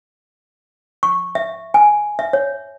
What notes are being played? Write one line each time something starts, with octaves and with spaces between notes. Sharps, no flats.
C#6
E5
G#5
E5
C#5